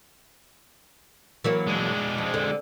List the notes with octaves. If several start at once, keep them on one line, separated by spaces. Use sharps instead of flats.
E3 F#3 A#3
G#3 D4
F2
D3